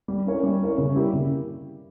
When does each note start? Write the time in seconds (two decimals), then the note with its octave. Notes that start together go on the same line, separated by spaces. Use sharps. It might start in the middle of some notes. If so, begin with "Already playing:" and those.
0.08 G3
0.26 C#4 E4 A#4 C#5
0.43 G3
0.61 C#4 E4 A#4 C#5
0.78 C#3
0.96 G3 A#3 E4 G4
1.13 C#3